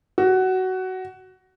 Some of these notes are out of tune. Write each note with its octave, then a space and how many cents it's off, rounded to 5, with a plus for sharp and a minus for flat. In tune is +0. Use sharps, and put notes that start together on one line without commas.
F#4 +15